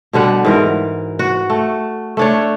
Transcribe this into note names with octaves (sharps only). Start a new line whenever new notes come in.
B2 D3 G3 F#5
G#2 E3 A#4
F#4
A3
A3 D4 C#5